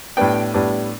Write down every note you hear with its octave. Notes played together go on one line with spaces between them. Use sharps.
A2 G3 B3 D4 G5
A2 G3 B3 D4